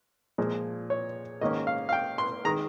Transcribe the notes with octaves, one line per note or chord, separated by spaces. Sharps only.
A#2 F3 G#3
C#5
G#2 D#3 A#3 C#4 D#5
F5
F5
G5
C6
D#3 G#3 A#5